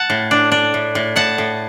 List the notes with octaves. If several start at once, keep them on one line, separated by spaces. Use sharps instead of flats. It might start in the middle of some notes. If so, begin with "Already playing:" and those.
Already playing: F#5 A5
A2
D4
D4
A2
A2
A2 F#5 A5
A2